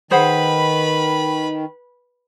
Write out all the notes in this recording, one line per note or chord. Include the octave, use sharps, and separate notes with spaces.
D#3 G#4 B4 C5 F#5 B5